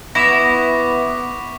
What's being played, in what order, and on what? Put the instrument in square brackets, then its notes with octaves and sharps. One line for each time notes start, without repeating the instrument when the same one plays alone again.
[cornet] B3 [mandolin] E4 [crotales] C#6 D6 B6 [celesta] A#6 E7